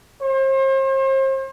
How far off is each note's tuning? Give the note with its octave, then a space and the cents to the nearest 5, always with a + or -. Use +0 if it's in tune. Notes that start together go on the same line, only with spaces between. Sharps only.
C5 +40